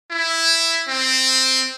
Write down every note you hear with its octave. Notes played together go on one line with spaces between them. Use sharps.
E4
C4